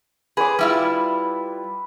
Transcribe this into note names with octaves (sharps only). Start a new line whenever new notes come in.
G#4 B4 C6 D6
G3 E4 F4